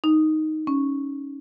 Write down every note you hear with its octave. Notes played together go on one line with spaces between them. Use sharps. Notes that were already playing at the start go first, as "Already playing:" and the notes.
D#4
C#4